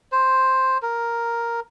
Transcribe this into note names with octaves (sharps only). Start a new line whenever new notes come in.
C5
A#4